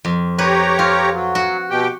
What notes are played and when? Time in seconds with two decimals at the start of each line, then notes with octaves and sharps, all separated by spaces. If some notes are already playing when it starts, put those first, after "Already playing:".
0.05 F2
0.38 G4 B4 C#5 A#5
0.79 F4
1.13 F#3
1.35 F#4
1.70 B2 G4 G5